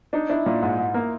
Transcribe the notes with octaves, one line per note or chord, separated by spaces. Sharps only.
D4 D#4
D4 E4
A#2 F4
G#2
G#2
A#3